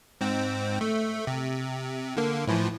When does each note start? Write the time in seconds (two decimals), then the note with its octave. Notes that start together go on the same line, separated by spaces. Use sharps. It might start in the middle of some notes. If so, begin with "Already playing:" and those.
0.21 G#2 C4
0.81 A3
1.27 C3
2.17 D3 A#3
2.47 A2 E3 F3